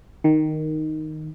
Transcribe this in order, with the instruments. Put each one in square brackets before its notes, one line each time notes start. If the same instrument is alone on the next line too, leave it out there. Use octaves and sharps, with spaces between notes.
[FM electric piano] D#3